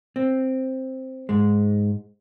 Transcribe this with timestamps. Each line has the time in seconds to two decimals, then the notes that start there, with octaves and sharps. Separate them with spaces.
0.16 C4
1.29 G#2 G#3